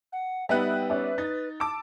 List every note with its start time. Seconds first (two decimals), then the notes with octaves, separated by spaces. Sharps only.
0.12 F#5
0.49 G3 B3 D#4 B4 E5 G5 F#6
0.90 C#4 D5 E5
1.18 D#4 A6
1.60 A5 D6 E6 D7